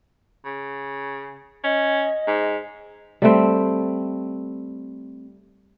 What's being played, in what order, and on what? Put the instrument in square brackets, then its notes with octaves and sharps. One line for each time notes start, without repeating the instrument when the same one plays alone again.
[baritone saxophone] C#3
[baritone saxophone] C#4 [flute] D#5
[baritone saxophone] G#2
[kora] G3 A3 C4